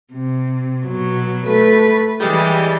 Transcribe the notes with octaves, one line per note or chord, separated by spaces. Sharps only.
C3
B2 F#3
A3 B4
E3 G3 G#3